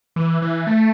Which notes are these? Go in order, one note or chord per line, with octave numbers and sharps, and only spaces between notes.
E3
E3
A3